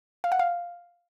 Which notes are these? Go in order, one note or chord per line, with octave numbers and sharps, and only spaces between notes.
F5
F#5
F5